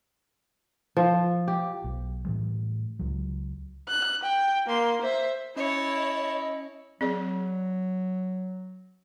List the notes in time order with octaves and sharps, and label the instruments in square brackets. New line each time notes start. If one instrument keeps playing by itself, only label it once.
[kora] F3
G4
[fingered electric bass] B1
A2 E3 G3
C#2 F#3
[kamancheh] F#6
G5
A#3 C6
C5 E5
[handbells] C#4 C#7 [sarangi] E4 [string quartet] C#5 A5 [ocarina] D#5
[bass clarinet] F#3 [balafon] C4 G#4 D5